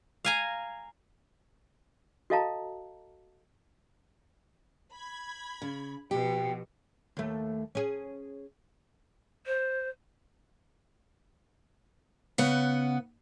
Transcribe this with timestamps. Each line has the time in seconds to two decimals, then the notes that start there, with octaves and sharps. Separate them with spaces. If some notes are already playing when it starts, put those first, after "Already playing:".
0.25 F5 G#5 A#5
2.30 F#4 A4 D#5 F5 A5 A#5
4.93 B5 G#6
5.62 C#3
6.11 B2 F3 G4
7.17 D#2 A3
7.75 C#4 G#4
9.46 C5
12.38 C#3 B3 F#5